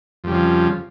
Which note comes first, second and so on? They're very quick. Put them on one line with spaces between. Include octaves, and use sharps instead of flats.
F2 G3 C#3 F3